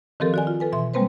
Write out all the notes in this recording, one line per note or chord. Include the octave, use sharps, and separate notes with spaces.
D#3 F3 C4 G4 A4 A#4
F#4 D5 G#5
F4
A4 B4 G#5
B2 E3 E5 C6
G3 G#3 A#3 C4 B4 C5